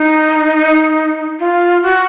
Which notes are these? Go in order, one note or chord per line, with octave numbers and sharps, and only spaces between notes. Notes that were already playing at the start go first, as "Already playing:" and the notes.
Already playing: D#4
F4
F#4